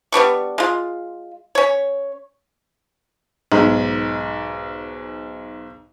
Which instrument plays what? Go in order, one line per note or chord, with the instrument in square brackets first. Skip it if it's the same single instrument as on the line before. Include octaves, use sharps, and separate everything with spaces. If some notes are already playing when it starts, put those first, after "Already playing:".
[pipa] G3 B3 D4 C#6
G#3 F4
C#4 C#5
[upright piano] B1 G#2